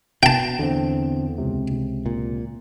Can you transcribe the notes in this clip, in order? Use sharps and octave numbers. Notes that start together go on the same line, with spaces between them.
B2 G5 A5
E2 D3 C4
C#2 C3
A#2